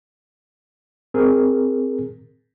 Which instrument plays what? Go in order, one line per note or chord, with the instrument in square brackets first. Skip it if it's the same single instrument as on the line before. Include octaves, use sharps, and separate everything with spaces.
[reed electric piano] C4 G#4 A#4